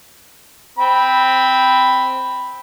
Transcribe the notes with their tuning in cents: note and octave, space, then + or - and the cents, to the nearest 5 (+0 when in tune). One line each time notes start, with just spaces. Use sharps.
C4 +0 B5 +0